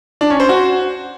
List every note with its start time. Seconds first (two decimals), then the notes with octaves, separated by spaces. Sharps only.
0.21 D4
0.30 C#4
0.40 C5
0.49 F#4